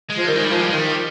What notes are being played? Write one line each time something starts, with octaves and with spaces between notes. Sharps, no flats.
G#3
F3
D#3 G3
G#3
G3
F3 G#3
G3
D#3 G#3
G3